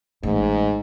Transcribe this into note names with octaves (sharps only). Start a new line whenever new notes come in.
A1 G#2